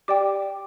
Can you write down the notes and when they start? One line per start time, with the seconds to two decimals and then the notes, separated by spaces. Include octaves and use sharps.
0.08 G4 D5 G5 D6